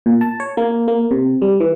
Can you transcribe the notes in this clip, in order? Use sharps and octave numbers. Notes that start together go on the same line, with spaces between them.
A#2
A5
C#5
A#3
A#3
C3
G3
E3